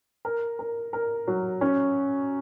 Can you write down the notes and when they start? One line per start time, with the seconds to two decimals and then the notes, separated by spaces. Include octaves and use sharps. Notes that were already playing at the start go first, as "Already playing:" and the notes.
0.25 A#4
0.59 A#4
0.93 A#4
1.27 F#3
1.61 C#4